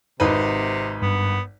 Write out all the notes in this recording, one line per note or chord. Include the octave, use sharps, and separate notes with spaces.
G#1 C3 D#4 B4
G2 B3